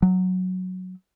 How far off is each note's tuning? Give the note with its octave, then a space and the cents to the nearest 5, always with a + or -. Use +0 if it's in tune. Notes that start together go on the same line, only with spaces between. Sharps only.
F#3 -5